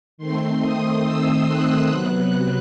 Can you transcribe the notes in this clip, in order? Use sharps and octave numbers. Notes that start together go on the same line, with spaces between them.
D#3 A3 C4 C6
D#6
E6
F#6
C3 F#3 B3 F#6